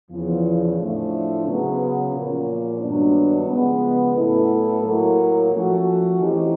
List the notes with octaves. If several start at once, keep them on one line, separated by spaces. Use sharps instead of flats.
E2 C#3 F3
A2 F3 A3 D4
C#3 F#3 B3
A#2 F3 A#3 C#4
G2 D#3 F#3 B3 D4
C#3 F3 G#3 B3
A2 F#3 B3 E4 A4
A2 F#3 A#3
F3 A3 C#4 F#4
E3 A3 C4 D#4 G4